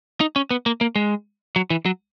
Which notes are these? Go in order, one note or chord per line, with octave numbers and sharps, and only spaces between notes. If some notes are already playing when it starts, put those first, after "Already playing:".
D#4
C#4
B3
A#3
A#3
G#3
F#3
E3
F#3